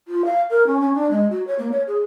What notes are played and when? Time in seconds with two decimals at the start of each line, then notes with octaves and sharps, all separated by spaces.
0.08 F4
0.25 F5
0.50 A#4
0.67 C#4
0.81 C#4
0.94 D4
1.11 G#3
1.31 F#4
1.47 C#5
1.59 A#3
1.72 C#5
1.87 G#4